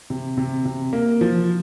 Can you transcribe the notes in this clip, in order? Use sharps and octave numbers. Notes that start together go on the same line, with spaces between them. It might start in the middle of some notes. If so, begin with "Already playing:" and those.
C3
C3
C3
A#3
F3